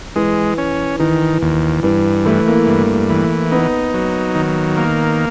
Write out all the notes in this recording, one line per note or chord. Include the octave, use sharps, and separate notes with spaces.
E3 G#3
C#4
D#3 E3
D#2
G2 E3
E3 A3
A#3
G2
E3
B3 D#4
F#3
D#3
A#3